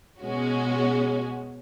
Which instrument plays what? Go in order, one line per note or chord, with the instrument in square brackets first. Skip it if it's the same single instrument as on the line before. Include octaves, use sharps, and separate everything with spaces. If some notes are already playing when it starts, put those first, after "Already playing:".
[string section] B2 G#3 C#4 F#4